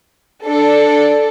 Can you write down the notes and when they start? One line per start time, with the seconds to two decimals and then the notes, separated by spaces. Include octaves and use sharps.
0.45 D4 A4